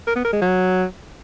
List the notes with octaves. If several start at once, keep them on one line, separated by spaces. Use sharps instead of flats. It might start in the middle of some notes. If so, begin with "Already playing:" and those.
A#4
B3
A#4
G#3
F#3